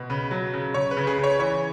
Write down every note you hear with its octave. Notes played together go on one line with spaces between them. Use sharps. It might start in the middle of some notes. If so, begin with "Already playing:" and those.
Already playing: B2
C#3 B4
F#3
C#3
C#3 C#5
B4
C#3
G#4
C#3
C#5
E3 C#5